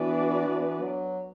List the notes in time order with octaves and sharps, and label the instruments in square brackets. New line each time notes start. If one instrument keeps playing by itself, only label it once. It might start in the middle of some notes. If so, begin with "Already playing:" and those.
Already playing: [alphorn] E3 [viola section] B3 D4 F#4 B4 D5
[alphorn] E3
F#3